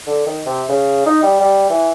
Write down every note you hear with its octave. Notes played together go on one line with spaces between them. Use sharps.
D3
D#3
C3
C#3
D#4
G3
G3
E3